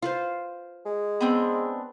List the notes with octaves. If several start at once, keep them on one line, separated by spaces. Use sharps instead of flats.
F4 B4 C5
G#3
B3 C4 D4